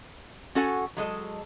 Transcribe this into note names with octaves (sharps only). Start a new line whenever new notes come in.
C#4 F#4 A4 F#5 G#5
F#3 G#3 A4 D#5